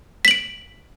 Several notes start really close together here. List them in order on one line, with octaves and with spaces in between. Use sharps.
B6 F#7 D7